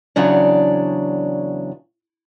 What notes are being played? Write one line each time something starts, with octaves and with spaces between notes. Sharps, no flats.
E2 C#3 F#3 D4